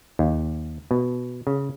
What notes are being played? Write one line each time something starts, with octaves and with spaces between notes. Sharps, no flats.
D#2
B2
C#3